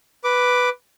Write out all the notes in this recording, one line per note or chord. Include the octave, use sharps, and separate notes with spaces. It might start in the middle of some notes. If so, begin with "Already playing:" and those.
B4 D6